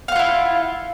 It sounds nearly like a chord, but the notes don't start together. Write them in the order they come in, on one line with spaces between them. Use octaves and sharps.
F5 F#5 F4 E4